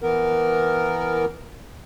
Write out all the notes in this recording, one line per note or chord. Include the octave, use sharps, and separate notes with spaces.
E3 B3 A#4